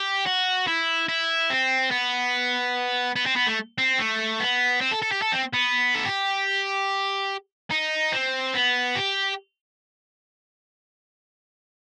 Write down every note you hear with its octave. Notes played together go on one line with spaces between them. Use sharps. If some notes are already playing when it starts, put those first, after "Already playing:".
Already playing: G4
F#4
E4
E4
C4
B3
B3
C4
B3
A3
C4
A3
B3
C4
A4
A4
G4
A4
C4
B3
A4
G4
D#4
C4
B3
G4